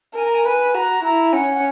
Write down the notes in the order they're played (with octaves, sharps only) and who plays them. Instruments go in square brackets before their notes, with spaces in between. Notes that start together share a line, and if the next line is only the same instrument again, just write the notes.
[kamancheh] A#4 [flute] G#5
[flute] A#5
G#5
[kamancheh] B4 [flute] G#5
[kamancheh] F#4 [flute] A#5
[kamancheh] E4 [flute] A#5
[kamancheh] C#4 [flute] F#5
[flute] F#5